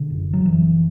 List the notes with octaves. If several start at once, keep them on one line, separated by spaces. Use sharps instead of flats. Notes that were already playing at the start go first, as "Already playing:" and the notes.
Already playing: B2 D3
F#1
F#3
F#1 E3